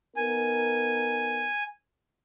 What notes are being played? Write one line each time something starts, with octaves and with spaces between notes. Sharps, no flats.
B3 D#4 A#4 G#5